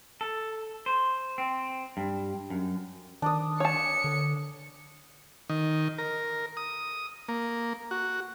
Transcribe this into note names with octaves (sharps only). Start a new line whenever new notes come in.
A4
C5
C4
G2
F#2
D#3 D4 D#6
C#5 A5 C#7
D3
D#3
A#4
D#6
A#3
F#4